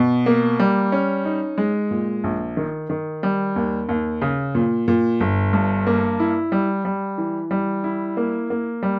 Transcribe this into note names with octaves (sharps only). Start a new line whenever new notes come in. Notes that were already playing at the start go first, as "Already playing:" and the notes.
Already playing: B2
A#3
G3
C#4
D#4
G#3
A#2
A#1
D#3
D#3
G3
D#2
D#2
C#3
A#2
A#2
G1
G2
A#3
E4
G3
G3
E3
G3
E4
A#3
A#3
G3